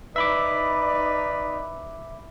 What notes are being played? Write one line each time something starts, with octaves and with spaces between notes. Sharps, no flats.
D#4 B4 D5 E5 B5 D6